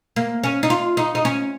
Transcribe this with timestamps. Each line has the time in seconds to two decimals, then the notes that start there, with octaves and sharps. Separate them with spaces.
0.16 A#3
0.44 C#4
0.63 D#4
0.70 F4
0.97 D#4
1.15 D#4
1.25 C#4